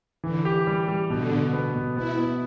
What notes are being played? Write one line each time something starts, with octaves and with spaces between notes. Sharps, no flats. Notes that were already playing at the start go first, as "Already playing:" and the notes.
D3 E3
G4
G3
G3
B2 D3
B2
B3
B2
B3 E4
B3